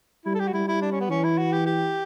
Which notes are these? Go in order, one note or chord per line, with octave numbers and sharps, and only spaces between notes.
G3 E4
A4
G4
F#4
G3 E4
E4
D4
C#4
B3
E3 C#4
E4
F#4
G4
G4